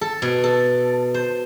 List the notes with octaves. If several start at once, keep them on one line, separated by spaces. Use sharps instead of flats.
A4
B2
A4
C5